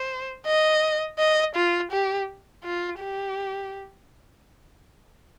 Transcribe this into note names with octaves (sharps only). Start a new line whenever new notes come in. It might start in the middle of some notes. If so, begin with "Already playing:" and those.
Already playing: C5
D#5
D#5
F4
G4
F4
G4